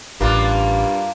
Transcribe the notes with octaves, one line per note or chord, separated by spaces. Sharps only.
A1 G2 A#3 D4 D#4 F4